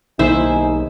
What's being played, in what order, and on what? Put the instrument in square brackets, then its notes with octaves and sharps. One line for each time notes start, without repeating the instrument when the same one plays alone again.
[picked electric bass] B1 D#3 A#3 [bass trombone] D#4 [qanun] E4 C5 E5 [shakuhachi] G#5